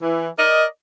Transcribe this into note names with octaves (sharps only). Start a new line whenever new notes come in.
E3
A#4 D5 D#5